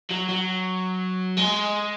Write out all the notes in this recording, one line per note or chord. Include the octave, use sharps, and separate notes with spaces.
F#3
F#3
G#3